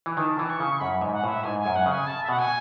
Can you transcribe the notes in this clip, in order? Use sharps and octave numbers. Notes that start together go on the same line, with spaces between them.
E3
D#3 A5
E3
C#6
C#3
F#2 B5
G#2
F#5
A2 E5
G#2 G#5
G#5
F#2
F#5
C#3
G#5
A5
E5
B2 F#5
G#5